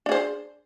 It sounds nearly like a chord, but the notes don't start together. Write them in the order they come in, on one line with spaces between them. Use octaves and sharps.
D4 G#4 C5